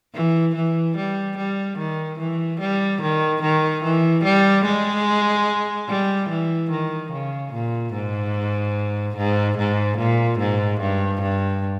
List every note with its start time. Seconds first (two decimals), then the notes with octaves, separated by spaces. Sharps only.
0.14 E3
0.55 E3
0.97 G3
1.37 G3
1.78 D#3
2.19 E3
2.60 G3
3.02 D#3
3.42 D#3
3.83 E3
4.24 G3
4.65 G#3
5.88 G3
6.29 E3
6.70 D#3
7.12 C#3
7.53 A#2
7.93 G#2
9.16 G#2
9.58 G#2
9.98 A#2
10.39 G#2
10.81 G2
11.21 G2